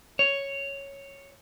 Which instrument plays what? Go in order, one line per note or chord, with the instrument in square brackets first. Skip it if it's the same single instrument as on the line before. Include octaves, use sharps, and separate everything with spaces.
[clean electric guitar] C#5